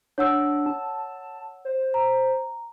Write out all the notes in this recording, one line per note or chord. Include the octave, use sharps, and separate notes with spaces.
D4 C#5 F#5 E6
A5
C5
A#5